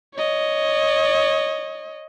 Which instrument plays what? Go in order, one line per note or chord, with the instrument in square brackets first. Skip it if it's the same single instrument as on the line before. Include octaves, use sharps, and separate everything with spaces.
[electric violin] C#5 D#5